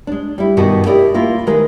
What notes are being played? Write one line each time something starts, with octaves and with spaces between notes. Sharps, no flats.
G#3 D4
G3 E4
G2 B2 D#3 F#4
E4 G4 A#4 D5 D#5
A#3 E4 F4
D#3 G#3 G#4 A#4 B4